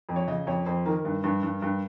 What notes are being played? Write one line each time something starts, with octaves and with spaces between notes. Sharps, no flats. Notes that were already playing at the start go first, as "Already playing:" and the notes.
F2
C#5
C#3 D#5
F2 C#5
F2 C5
D#3 A#4
G2
G2
G2
G2